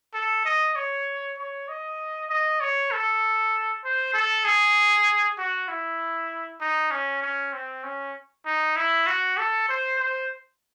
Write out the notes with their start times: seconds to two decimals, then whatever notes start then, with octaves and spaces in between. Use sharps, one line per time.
0.14 A4
0.45 D#5
0.76 C#5
1.38 C#5
1.69 D#5
2.30 D#5
2.60 C#5
2.91 A4
3.84 C5
4.14 A4
4.45 G#4
5.38 F#4
5.68 E4
6.61 D#4
6.91 C#4
7.22 C#4
7.53 C4
7.84 C#4
8.46 D#4
8.76 E4
9.07 F#4
9.38 A4
9.69 C5
9.99 C5